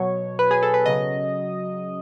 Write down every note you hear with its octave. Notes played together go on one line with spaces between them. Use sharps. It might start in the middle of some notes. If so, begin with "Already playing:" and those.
Already playing: B2 F#3 C#5
B4
G#4
A4
B4
C#3 F#3 D#5